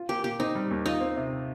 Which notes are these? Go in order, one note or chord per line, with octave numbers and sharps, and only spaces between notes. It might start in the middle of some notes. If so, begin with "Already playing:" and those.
Already playing: F4
A#3 G4
A#2 G4
C4 D#4
G3
D#2
D#4 F4
C4
C3